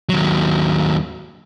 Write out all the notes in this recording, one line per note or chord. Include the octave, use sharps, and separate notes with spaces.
D#2 F#3